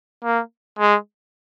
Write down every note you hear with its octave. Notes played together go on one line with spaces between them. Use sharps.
A#3
G#3